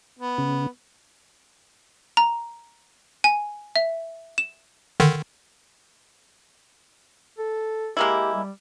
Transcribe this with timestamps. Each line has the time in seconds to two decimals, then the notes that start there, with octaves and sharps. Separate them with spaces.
0.19 B3
0.38 C#3
2.17 A#5
3.24 G#5
3.76 E5
4.38 E7
5.00 D3 D#3
7.38 A4
7.97 G#3 A#3 E4 G4
8.34 G3